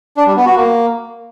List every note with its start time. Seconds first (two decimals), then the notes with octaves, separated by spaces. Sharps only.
0.17 D4
0.27 G3
0.36 B3
0.46 F#4
0.55 A#3